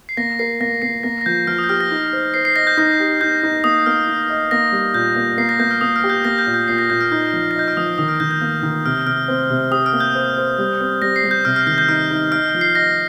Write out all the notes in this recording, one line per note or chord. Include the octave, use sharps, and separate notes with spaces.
C7
A#3 A#6
A#4 C7
A#3 A#6
A#3 C7
A#3 A#6
A#6
F3 G6
F3 F6
D#6
G6
G4 F6
A#6
D#4
C5
C5 C7
C7
D#5 A#6
G6
D#4 A#6
G4
D#4 G6
D#4
A#3 D#6
A#3 F6
D#4
D#5
A#3 A#6
G3
A#2 G6
A#3
A#3 C7
A#6
A#3 G6
F6
A#3 D#6
F6
G4
G6
A#3 A#6
G6
A#2
G6
A#2 C7
A#6
A#2 G6
F6
D#4 G6
F3
A#6
D#5 G6
F6
F3 D#6
D#3 D#6
F6
D#3 G6
G6
A#3
D#3
C3 F6
C3 F6
C4
C3
G4 D#6
F6
A#3
G6
C5
C5
G3
C4
G3 A#6
C7
G3
G6
C3 F6
F6
D#3 G6
G6
D#4 F6
D#4
D#5 F6
F3
C7
D#5 A#6